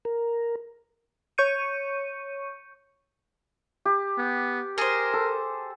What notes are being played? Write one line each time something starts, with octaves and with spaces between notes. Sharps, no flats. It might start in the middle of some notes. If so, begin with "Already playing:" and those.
A#4
C#5 C#6 G6 C#7 D#7
G4
B3
G#4 A#4 C5
A4